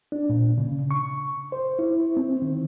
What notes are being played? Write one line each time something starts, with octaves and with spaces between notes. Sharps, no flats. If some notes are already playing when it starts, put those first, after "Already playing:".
D4
A#2
C#3
C#6
C5
E4
C4
D#3